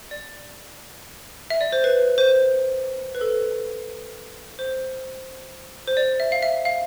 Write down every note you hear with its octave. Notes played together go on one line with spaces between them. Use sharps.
D5
E5
D5
C5
B4
C5
B4
A4
C5
C5
D5
E5
F5
E5
F5